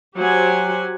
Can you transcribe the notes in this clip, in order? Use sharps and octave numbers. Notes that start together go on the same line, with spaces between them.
F#3 G4 C5 F#5 G#5